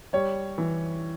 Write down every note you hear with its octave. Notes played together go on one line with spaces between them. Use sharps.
G3 C#5
E3